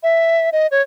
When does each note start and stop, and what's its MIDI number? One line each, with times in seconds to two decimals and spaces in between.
0.03 0.50 76
0.52 0.67 75
0.71 0.82 73